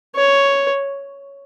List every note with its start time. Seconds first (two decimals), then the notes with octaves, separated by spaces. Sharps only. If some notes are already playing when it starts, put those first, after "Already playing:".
0.16 C#5